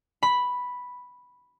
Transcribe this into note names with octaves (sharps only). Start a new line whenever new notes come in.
B5